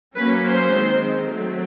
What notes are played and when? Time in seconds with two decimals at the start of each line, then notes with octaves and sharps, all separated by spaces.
0.16 F#3 A#3 C#4 B4
0.45 C5
0.73 D#3 G#3 C4
1.30 F#3 A3 C4